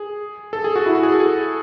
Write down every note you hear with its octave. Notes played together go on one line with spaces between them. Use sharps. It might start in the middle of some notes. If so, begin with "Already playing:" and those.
Already playing: G#4
A4
G#4
F#4
E4
F#4
G#4
A4
G#4